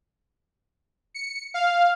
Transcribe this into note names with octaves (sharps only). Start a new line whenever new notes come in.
C#7
F5